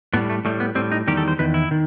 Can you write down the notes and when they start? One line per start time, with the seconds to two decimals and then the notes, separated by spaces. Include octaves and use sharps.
0.13 A2 B3
0.16 G3
0.30 A3
0.45 A2 G3 A3
0.60 B3
0.75 A2 G3 C4
0.92 D#4
1.07 E2 D#3 G3 G4
1.17 A4
1.28 C5
1.39 E2 D#3 B4
1.54 E4
1.71 D#3